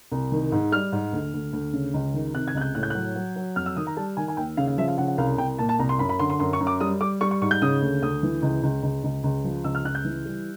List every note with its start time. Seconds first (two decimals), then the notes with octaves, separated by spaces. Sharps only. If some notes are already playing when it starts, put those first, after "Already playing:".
0.12 C2
0.32 D#3
0.52 G#2
0.72 G3 F6
0.92 G#2
1.13 D2
1.34 D2
1.53 D2
1.73 C#3
1.94 C#2
2.14 D#3
2.34 C3 F#6
2.48 G#6
2.54 C#2 F#6
2.61 G6
2.75 A2 F#6
2.83 G6
2.90 F#3 F#6
3.15 F#3
3.36 F#3
3.56 F2 F6
3.66 E6
3.76 D#3 D#6
3.87 A#5
3.97 G3 A5
4.17 D#3 G#5
4.28 G#5
4.37 D#2 G5
4.57 C#3 F5
4.68 F5
4.78 F3 E5
4.88 F5
4.98 C#3 F#5
5.08 F#5
5.18 C2 F5
5.38 C2 G5
5.59 A#2 A5
5.69 A5
5.79 C2 A#5
5.89 C6
5.99 F#2 B5
6.09 B5
6.19 D3 C6
6.30 C6
6.40 F#2 C6
6.53 C#6
6.60 F#2
6.67 D6
6.80 G3 D#6
7.01 G3 D6
7.21 G3 C#6
7.31 C#6
7.42 G#2 C#6
7.51 G6
7.62 C#3 D#6
7.82 D2
8.02 D2 D#6
8.23 E3
8.42 C#2
8.63 C#2
8.83 C#2
9.04 C#2
9.24 C#2
9.44 F3
9.64 C#2 E6
9.75 F6
9.84 C#2 F#6
9.95 G6
10.05 E3
10.26 G3